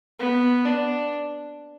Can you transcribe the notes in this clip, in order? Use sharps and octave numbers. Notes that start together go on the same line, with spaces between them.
B3
D4